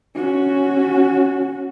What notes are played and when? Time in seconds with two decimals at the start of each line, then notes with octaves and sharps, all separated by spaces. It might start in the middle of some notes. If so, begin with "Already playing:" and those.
0.15 C#4 F#4